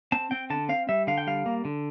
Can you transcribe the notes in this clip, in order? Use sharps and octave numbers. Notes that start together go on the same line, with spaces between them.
C4 A5
C4 G5
D3 A5
C4 F5
G3 E5
D3 F5
G5
G3 F5
A#3
D3